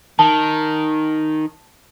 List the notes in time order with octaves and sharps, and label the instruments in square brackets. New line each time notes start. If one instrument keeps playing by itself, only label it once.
[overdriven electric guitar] D#3 [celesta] A5